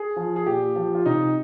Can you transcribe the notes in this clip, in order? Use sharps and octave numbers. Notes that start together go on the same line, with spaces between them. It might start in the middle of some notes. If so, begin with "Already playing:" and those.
Already playing: G#4
F3
G#4
A#2 G4
F3
F4
C3 D#4